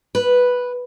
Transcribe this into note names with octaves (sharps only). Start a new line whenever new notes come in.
B4